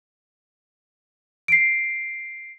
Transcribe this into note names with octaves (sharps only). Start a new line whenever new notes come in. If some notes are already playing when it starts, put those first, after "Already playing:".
C7 D7